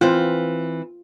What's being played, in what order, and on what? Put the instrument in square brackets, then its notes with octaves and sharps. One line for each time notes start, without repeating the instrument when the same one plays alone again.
[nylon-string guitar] E3 C4 [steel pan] F4